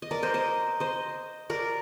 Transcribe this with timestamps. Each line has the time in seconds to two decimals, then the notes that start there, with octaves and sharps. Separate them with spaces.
0.02 D#5
0.11 A#4 D5
0.22 C5 D#5
0.34 C5 D#5
0.80 C5 D#5
1.50 A#4 D5